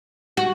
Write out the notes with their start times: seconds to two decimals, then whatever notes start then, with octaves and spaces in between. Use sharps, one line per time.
0.37 F#4